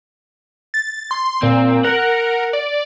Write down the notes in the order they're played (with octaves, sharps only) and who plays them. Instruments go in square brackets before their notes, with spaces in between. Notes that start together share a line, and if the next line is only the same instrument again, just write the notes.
[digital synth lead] A6
C6
[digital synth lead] A#2 [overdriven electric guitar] C4
[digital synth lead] A#4 [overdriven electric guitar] F#5
[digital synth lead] D5